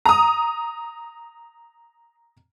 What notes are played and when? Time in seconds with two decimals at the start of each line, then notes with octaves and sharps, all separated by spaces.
0.06 A#5 D#6